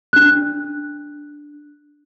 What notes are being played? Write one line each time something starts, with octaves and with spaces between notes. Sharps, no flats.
D4 F#6